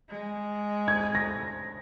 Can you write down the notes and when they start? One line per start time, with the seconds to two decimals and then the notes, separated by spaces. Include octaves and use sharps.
0.09 G#3
0.88 G#6
1.15 A#6